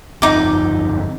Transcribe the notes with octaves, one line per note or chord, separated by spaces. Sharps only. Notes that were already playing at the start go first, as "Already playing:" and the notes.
G1 F2 C4 D#4 D6